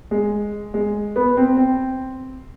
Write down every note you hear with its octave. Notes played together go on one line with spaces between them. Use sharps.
G#3
G#3
B3
C4
C4